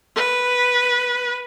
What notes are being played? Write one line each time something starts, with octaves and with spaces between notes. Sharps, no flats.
B4